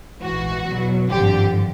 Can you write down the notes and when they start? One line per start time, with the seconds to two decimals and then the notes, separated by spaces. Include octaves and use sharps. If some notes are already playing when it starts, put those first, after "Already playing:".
0.21 A#1 G#2 E3 F#4
0.66 E2 B2 F#3
1.09 G#1 G2 D3 F3 G4